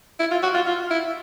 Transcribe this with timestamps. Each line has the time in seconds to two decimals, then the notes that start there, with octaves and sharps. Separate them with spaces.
0.19 E4
0.31 F4
0.43 F#4
0.54 F4
0.66 F4
0.90 E4